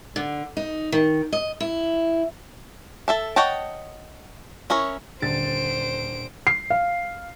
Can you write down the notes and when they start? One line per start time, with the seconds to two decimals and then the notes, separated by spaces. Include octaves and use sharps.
0.16 D3
0.57 D#4
0.92 D#3
1.32 D#5
1.60 E4
3.08 A4 E5 A5
3.36 C#5 D#5 F#5 G5 A5
4.70 C#4 E4 A#4 C#5
5.22 D#1 D3 C5 A6 D7
6.47 C7
6.70 F5